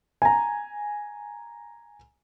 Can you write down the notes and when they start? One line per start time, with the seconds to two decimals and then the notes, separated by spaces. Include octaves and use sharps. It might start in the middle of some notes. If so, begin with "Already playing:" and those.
0.22 G#5 A#5